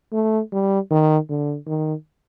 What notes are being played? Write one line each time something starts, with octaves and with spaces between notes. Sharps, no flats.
A3
G3
D#3
D3
D#3